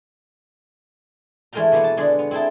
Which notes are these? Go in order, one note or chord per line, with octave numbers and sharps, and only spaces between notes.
E3 G#3 A3 A#4 G5 A#5
B2 E3 A#3 B3 E4
A5
D3 G#3 G#4 D5
B3
C4 E4 G#4 G5 A5